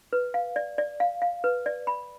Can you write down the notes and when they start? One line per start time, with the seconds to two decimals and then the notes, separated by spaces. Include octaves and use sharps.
0.13 B4
0.34 F5
0.56 D5
0.78 D5
1.00 F5
1.22 F5
1.44 B4
1.66 D5
1.87 B5